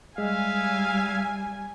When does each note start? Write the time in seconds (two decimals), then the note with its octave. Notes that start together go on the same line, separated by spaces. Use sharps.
0.18 G3 G#3 E5 F5 G#5